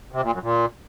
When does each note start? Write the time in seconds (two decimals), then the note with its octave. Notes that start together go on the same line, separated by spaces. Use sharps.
0.12 C3
0.22 A#2
0.32 F#2
0.43 A#2